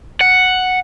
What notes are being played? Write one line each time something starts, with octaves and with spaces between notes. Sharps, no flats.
F#5